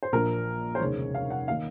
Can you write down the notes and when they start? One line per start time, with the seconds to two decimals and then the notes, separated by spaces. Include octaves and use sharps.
0.03 C5
0.12 A#1 A#2 F3 A#4
0.75 C5
0.80 F1 D#2 C#3 G#3 C#5
1.15 F5
1.30 F#5
1.48 D#3 A#3 F5